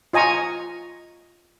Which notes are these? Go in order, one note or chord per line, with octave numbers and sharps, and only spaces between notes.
F4 D#5 G#5 A#5 C#6